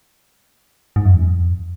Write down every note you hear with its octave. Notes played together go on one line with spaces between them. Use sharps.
G#2
F#2
E2
F2